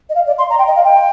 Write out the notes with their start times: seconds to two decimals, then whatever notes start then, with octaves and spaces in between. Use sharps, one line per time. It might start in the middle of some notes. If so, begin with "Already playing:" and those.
0.10 D#5
0.15 F5
0.27 D5
0.38 C6
0.50 A#5
0.59 G5
0.67 D#5
0.76 F5
0.84 G5